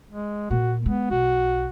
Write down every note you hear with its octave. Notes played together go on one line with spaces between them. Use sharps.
G#3
A#2 A#3 F#4
G#3 B3
B1 F#4